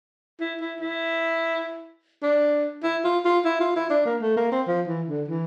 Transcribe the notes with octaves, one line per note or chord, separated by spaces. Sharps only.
E4
E4
E4
D4
E4
F4
F4
E4
F4
E4
D4
A#3
A3
A#3
C4
F3
E3
D3
E3